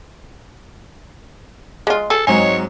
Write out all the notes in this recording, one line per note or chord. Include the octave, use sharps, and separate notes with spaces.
G#3 F4
G#4 A4
G#2 F#3 G#3 C4 C#5 D#5 G#5